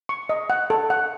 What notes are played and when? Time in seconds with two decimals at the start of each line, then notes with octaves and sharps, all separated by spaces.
0.09 C#6
0.29 D#5
0.50 F#5
0.70 A4
0.90 F#5